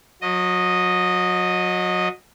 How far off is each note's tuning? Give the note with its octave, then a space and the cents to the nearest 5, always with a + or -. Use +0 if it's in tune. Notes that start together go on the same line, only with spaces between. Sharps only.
F#3 -30 D#5 -5